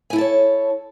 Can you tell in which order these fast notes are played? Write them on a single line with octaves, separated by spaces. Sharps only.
G#5 E4 A4 A5 C#5